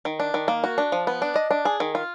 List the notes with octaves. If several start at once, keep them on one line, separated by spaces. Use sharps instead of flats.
D#3
D4
D#3
A#3
F#4
D4
F3
B3
D4
D#5
D4
G#4
D#3
F4